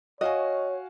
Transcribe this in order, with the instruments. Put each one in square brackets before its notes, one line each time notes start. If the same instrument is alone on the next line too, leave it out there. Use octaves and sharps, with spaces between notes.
[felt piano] F#4 F5 G#5 [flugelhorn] C#5 [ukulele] D#5